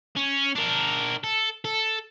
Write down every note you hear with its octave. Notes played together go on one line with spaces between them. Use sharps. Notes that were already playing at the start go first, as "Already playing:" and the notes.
C#4
D4 A#4
A4
A4